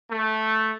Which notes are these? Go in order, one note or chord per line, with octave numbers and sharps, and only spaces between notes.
A3